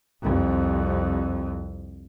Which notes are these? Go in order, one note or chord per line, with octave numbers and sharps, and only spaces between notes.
C2 F2